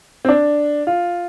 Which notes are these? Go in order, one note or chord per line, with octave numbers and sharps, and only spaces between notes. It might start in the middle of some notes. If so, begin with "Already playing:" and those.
C4
D4
F4